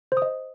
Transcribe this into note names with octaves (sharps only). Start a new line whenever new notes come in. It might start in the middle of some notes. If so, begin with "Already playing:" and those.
C5
D#6
D#5